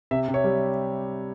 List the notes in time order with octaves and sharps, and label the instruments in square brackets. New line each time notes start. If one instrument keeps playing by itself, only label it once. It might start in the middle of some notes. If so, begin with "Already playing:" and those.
[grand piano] C3 E5
C3
C#5
G3